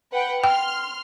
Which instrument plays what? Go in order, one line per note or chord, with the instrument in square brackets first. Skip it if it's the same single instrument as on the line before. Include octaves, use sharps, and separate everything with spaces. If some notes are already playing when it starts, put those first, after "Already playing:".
[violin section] B4 F#5 G5
[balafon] G5 [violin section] C6 F6